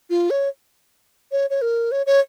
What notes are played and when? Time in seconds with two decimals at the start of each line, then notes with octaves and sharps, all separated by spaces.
0.10 F4
0.30 C#5
1.32 C#5
1.50 C#5
1.62 A#4
1.92 C#5
2.06 C#5